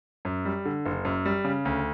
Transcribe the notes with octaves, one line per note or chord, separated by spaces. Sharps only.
F#2
G3
D3
F#1
F#2
G3
C#3
D2